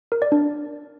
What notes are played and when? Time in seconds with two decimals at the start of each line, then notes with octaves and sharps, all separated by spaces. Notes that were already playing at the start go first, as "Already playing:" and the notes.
0.12 A#4
0.22 D5
0.32 D4